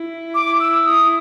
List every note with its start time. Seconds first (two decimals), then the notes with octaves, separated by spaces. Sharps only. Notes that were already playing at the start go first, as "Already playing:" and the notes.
Already playing: E4
0.35 D6
0.60 E6
0.86 D#6